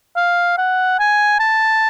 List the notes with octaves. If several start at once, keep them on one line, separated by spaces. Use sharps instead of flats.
F5
F#5
G#5
A5